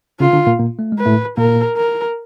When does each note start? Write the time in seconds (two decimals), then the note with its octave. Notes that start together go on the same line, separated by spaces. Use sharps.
0.20 C#3 C#4 F4
0.33 D3 D4
0.47 A#2 A#3
0.59 A#2 A#3
0.79 A3
0.92 G#3
0.99 B4
1.06 A2 A3
1.37 A#2 A#3 A#4
1.77 A#4